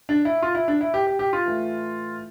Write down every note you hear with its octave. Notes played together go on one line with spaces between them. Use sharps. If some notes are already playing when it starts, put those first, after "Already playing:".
D4
E4
F4
E4
D4
E4
G4
G4
G4
F4
A2 E3 A3